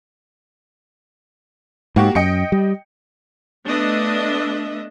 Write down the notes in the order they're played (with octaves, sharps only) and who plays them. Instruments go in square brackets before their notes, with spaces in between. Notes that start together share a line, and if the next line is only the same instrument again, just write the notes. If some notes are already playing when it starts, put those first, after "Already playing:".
[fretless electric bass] G#2 [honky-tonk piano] A#3 F#4 G4
[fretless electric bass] F#2 [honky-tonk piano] D#5 G5 C#7
[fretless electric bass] G3
[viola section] A3 B3 D4 D#5 E5